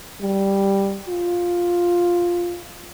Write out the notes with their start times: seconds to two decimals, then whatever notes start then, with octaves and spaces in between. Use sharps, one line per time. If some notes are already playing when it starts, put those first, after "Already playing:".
0.21 G3
1.08 F4